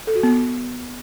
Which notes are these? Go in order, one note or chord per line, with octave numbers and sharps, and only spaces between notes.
A4
F#4
B3